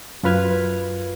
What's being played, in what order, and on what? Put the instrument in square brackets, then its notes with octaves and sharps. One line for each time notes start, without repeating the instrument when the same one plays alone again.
[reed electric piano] F#2 F4 B4 F6 G#6